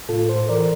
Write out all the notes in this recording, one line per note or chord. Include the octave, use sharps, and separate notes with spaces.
A2 F4 A4
A4 C5
E3 A#4 D5